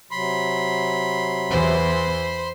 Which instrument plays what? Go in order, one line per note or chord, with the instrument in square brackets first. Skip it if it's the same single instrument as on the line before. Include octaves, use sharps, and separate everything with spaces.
[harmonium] C3 F#3 [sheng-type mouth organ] B5 C6
[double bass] E2 E3 [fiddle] C5